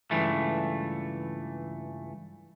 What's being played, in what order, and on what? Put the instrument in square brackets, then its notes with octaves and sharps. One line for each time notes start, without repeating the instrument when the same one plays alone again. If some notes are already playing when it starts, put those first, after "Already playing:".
[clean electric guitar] C#2 G2 E3 A3